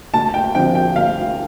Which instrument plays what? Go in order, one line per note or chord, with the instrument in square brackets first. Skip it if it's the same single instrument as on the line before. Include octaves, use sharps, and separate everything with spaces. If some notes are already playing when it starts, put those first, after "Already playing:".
[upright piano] D2 A5
G5
D3 F3 C4 G5
G5
D2 F5